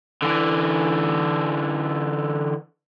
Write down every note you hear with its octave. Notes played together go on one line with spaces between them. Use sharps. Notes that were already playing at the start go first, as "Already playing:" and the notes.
D3 E3